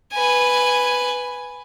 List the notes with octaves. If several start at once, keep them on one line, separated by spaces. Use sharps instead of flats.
B4 G#5